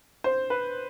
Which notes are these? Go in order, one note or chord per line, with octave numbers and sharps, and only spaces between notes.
C5
B4